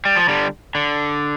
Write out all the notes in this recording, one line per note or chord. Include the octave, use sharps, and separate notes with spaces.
G3
F3
D3 G3
D3